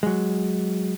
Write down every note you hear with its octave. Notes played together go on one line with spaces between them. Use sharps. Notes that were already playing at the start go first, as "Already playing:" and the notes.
F#3 G#3